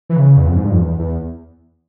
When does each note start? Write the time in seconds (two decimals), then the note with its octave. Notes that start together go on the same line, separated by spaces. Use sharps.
0.09 E3
0.16 C#3
0.37 E2
0.47 F2
0.56 G#2
0.64 G2
0.71 F2
0.78 E2
0.99 E2